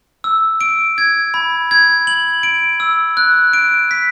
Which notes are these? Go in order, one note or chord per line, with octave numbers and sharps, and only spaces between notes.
E6
D7
G#6
B5
G#6
F#7
D7
E6
F#6
D7
B6